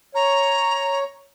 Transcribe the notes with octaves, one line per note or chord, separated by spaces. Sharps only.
C#5 A#5